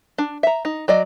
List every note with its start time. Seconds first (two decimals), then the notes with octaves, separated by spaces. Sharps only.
0.18 D4
0.43 E5 A#5
0.65 D#4
0.88 F#3 D5 D#5